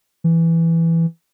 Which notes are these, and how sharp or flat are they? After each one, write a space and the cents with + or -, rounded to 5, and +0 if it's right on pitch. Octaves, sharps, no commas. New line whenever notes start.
E3 +5